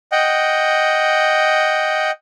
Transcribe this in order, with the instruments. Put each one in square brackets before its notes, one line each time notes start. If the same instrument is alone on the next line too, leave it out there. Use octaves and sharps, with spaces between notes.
[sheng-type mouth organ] D#5 F#5 G5